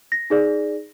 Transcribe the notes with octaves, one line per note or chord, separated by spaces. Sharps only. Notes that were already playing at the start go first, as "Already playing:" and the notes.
A#6
D#4 G#4 D5